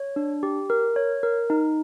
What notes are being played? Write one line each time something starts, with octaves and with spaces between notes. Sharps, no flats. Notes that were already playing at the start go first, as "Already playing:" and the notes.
Already playing: C#5
D4
G4
A#4
C#5
A#4
D#4